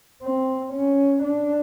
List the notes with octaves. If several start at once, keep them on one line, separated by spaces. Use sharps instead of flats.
C4
C#4
D4